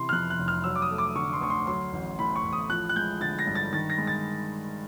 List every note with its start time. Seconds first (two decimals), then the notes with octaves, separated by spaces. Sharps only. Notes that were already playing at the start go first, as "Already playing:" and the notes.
Already playing: C3 E3 C6
0.09 F6
0.13 F2 F#6
0.30 F#6
0.39 F1
0.48 F6
0.64 F#3 E6
0.76 D6
0.82 D#6
0.90 A3
0.98 D6
1.16 D3 C#6
1.33 C6
1.41 D2 C#6
1.50 C6
1.67 F#3 C6
1.93 A1
2.19 A2 B5
2.36 C#6
2.44 A1
2.53 D#6
2.70 F3 F#6
2.89 F#6
2.96 G#3 G6
3.21 D3 A6
3.39 A#6
3.47 G2
3.55 A6
3.72 D#3 A6
3.90 A#6
3.98 G#3
4.07 A6